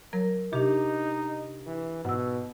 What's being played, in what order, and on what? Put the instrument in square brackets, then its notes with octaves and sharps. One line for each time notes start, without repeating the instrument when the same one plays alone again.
[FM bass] F#3 [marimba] A#4
[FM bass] C3 [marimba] D4 G4 [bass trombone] D#4
[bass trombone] E3
[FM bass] G#2 [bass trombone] B2 [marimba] F#5 E6